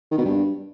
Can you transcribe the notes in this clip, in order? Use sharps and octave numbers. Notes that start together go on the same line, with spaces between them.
D#3
B2
G2